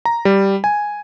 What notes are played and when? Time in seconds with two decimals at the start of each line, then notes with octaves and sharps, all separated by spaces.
0.05 A#5
0.25 G3
0.64 G#5